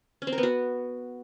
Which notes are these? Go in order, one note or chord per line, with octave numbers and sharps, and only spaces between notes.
C#4
C4
A#4
B3
F#4